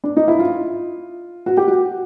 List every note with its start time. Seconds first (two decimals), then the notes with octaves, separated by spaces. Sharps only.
0.04 D4
0.17 D#4
0.28 E4
0.39 F4
1.46 F#4
1.57 G4
1.68 F#4